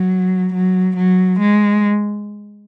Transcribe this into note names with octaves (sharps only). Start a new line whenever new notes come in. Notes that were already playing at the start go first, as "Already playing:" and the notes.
Already playing: F#3
F#3
F#3
G#3